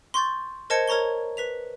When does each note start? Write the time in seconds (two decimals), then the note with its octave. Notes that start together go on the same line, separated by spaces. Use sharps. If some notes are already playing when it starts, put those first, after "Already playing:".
0.14 C6 C#6 G6 A6
0.70 A#4 C5 D#5 A5 G#6 C#7
0.88 A#4 C#5 A#5 C#6 G7
1.37 B4 B6 F7